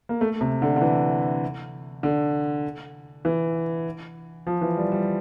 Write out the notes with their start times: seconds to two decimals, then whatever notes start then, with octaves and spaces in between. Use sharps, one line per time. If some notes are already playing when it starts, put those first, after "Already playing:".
0.09 A#3
0.21 A3
0.41 C3
0.62 D3
0.76 D3
0.81 E3
2.03 D3
3.25 E3
4.47 F3
4.61 E3
4.77 G3
4.92 G3